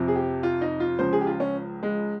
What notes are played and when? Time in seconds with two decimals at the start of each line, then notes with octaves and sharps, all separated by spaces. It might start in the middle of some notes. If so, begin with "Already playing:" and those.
Already playing: F2 C3 F3
0.08 G#4
0.15 G4
0.43 F4
0.61 D#4
0.80 F4
0.99 C#2 C#3 F3 C5
1.13 G#4
1.21 G4
1.27 F4
1.40 C#4
1.83 G#3